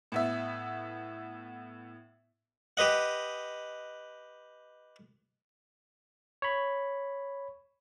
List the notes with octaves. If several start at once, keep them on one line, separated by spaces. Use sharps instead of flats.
A2 B3 E5
G4 B4 D#5 F#5
C#5 B5